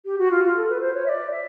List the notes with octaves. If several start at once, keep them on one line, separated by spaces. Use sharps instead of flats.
G4
F#4
F4
F4
A4
B4
C5
C#5
E5
D5
E5